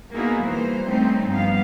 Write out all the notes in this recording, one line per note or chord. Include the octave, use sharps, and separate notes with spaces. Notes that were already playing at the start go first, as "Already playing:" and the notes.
A#3 B3 D#4 E4 F#4 G#4
E3 G3 A#3 C5
G3 A3 C4 C#4 D#4
G2 F3 G3 B3 F5